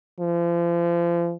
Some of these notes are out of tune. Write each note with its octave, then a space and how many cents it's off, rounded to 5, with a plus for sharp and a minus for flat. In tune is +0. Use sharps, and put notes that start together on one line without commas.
F3 -35